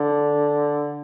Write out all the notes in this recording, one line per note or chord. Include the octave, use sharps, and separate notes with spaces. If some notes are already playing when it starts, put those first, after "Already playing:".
Already playing: D3